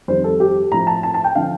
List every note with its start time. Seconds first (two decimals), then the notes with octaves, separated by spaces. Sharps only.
0.08 F2 D#3 G3 C5
0.24 A4
0.40 G4
0.72 A2 F3 A#5
0.87 A5
1.03 A5
1.14 A5
1.24 G5
1.35 D3 F3 F5